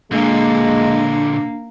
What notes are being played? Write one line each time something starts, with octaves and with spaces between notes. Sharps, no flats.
A#2 D3 G#3 A#3 D4